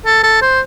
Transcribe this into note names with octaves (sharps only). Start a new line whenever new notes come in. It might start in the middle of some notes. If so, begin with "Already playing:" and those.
A4
A4
C5